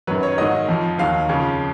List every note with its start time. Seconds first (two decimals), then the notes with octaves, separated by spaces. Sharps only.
0.07 F#2 D#3 F#3 B4
0.23 C#5
0.38 G#2 D#3 F#3 D#5
0.69 F2 F3
0.98 D#2 D#3 F#3 F5
1.29 F2 C#3 F3